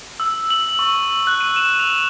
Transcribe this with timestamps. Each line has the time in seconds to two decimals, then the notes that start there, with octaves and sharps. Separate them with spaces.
0.20 E6
0.50 F#7
0.79 C#6
1.27 F#6
1.41 D#7
1.56 E7
1.80 F7